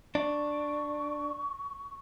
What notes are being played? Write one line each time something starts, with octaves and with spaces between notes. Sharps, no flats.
D4 C#6